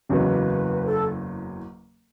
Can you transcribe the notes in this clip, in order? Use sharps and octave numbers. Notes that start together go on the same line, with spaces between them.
F#1 E2 C#3 F#3 B4
A4